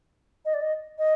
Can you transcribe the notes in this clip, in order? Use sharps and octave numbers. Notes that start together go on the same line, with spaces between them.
D#5
D5
D#5
D#5